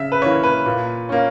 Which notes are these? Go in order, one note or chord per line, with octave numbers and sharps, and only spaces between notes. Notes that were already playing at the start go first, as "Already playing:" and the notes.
Already playing: C#3 E5
B4
E3 A#3 C#4 C#5
B4
A#2
A#3 C#4